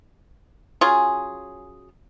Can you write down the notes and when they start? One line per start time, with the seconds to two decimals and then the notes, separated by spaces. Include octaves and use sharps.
0.81 F#3 C#4 F4 G#4